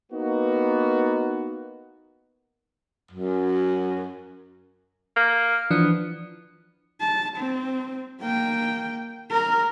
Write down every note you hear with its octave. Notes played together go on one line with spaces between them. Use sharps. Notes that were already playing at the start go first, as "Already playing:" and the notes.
A#3 B3 D#4 F#4
F#2
A#3 F6
E3 F3 B3 D4
A5
C4
A#3 G5
A#4 A#5